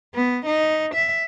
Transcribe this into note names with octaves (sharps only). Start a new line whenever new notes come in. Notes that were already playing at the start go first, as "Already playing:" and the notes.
B3
D#4
E5